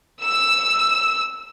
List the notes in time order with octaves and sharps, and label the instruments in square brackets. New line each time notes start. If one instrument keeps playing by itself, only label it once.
[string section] E6